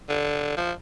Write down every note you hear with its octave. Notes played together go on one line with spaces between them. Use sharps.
D3
F3